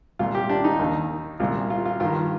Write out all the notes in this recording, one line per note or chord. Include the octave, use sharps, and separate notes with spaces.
C2 A#2 F4
G4
D4
D#4
D#2 D#3
C2 A#2 F4
F4
F4
G2 D#3 F4